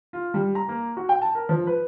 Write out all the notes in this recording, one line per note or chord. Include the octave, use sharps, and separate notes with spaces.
F4
G3
A#5
A#3
F#4
G5
A5
A#4
F3
B4